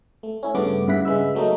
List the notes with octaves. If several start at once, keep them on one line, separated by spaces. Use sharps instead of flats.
A3
C#4 E4
G2 C#3 A3 B3 D6
G2 C#3 E4 F#5 B6
C#3 G#3 B4 E5
F#3 A3 A#3 D#4